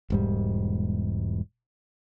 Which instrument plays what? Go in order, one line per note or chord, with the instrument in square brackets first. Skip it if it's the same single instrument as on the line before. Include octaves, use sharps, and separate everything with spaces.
[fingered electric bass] E1 G#2 G3